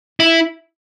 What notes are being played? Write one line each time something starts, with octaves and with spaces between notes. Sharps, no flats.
E4